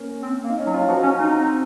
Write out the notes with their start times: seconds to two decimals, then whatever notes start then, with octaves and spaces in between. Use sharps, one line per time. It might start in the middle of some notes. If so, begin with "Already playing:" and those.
Already playing: A#3 C#4
0.22 C4
0.44 A#3
0.49 D#4
0.59 C#4
0.66 F#3
0.74 F4
0.88 F3 F#4
1.03 C#4
1.10 F4
1.18 D#4
1.32 C4